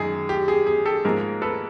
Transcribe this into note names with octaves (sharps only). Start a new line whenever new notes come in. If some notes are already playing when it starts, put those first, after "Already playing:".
Already playing: F#2 D#3 G#3 G#4
G4
G#4
G#4
G4 A4
G#2 F3 A#3 G#4 A#4
A4 B4